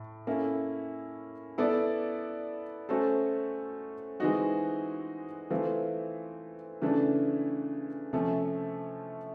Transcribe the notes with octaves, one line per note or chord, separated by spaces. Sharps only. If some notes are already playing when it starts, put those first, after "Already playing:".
Already playing: A2
A#3 C#4 E4 A4
B3 E4 A4 D5
A3 C#4 F#4 A4 C5
E3 G#3 C4 D#4 F#4
E3 A3 C4 F4
C#3 E3 A3 D4
C3 F3 A3 C#4